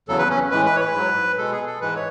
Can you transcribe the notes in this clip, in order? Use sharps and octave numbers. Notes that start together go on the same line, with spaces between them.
E2 C#3 F#3 A4
B4
C#4
A2 E3 G#3 B4
B4
C#5
B4
G#2 F#3
B2 G#3 A4
G#4
A4
G#2 E3 G#3 B4
C#5